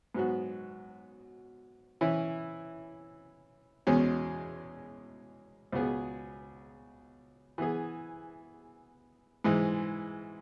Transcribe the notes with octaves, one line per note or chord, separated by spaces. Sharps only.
G#2 F#3 B3 F#4
E3 C#4 E4
E2 B2 G#3 C#4
C#2 B2 B3 G#4
E3 B3 G#4
G#2 E3 G#3